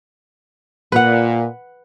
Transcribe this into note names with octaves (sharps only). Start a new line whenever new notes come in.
A#2 B4 F#5